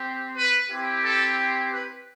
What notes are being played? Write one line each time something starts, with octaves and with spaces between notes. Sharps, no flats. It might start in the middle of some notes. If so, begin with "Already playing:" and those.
Already playing: C4 G4
B4
C4 E4 G4
A4
B4